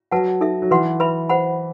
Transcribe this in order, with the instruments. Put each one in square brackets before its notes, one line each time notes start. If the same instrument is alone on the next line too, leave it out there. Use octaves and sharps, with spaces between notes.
[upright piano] F#3 [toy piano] B4 F#5 A5
[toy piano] D#4 A4 E5
[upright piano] F#3
[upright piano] E3 [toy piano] B4 F#5 C6
[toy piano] B4 E5 B5
C5 F#5 B5